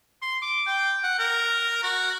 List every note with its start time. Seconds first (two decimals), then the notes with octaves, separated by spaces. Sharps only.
0.22 C6
0.42 D6
0.67 G5
1.04 F#5
1.19 A#4
1.83 F#4